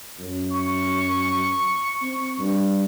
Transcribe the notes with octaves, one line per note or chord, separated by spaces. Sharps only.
F#2
C#6
C4
G2